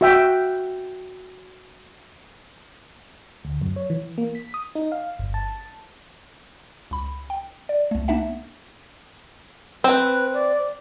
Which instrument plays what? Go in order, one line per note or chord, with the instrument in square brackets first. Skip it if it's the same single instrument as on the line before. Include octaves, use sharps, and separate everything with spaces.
[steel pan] F#4 E5 G5
[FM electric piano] D2
F#2
C#5
E3
A#3
B6
D#6
D#4
F5
G1
A5
[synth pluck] C#2 B5
G5
D5
C2 A3
A#3 B3 D4 D#4 E5 F#5
[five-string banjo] C4 [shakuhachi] B4
[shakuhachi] D5